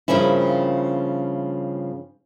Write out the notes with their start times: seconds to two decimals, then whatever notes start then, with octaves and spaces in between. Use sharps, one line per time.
0.08 G2 C#3 F3 A#3 C#4 E4